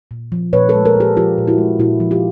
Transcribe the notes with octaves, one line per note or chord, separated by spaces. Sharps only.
A#2
F3
A#2 B4 C#5
A4 B4
G#3
G#4 A#4
A#2 G4 A4
F3 F4 G4
A#2
E4 F#4
G#3
A#2 E4 F#4
F3
F4 G4